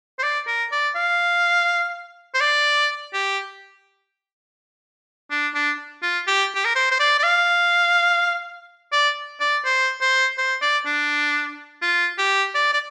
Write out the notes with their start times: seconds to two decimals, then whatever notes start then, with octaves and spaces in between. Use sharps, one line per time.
0.19 C5
0.23 D5
0.48 A#4
0.72 D5
0.96 F5
2.34 C5
2.41 D5
3.13 G4
5.31 D4
5.55 D4
6.03 F4
6.27 G4
6.55 G4
6.65 A#4
6.75 C5
6.91 C5
6.99 D5
7.19 D5
7.24 F5
8.93 D5
9.41 D5
9.65 C5
10.01 C5
10.38 C5
10.62 D5
10.86 D4
11.82 F4
12.18 G4
12.55 D5
12.73 D5